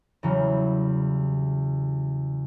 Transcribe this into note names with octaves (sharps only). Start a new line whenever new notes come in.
E2 C#3 F#3 G3